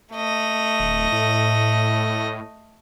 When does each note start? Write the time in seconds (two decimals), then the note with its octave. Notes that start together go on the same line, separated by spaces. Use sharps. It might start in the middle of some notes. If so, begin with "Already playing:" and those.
0.14 A3 D#5
0.80 D1
1.12 A2